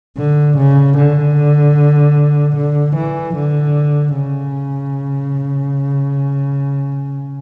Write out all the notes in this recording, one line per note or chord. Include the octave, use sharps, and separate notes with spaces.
D3
C#3
D3
D3
E3
D3
C#3